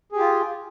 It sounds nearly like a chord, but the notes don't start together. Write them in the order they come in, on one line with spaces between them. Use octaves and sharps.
G#4 G4 F4